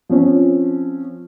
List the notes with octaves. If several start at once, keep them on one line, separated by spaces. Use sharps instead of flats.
F3 C4 C#4